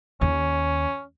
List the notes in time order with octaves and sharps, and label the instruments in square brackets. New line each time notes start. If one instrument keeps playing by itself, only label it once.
[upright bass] D#2 [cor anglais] C#4